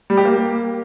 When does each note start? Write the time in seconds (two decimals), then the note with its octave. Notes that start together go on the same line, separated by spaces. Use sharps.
0.10 G3
0.17 G4
0.25 A#3